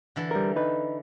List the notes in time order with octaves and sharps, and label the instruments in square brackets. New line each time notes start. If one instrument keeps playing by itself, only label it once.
[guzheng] D3 E3 A4
[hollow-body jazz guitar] G3 A#4
D#4 B4